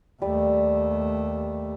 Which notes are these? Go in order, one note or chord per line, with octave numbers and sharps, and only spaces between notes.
D#2 G3 A3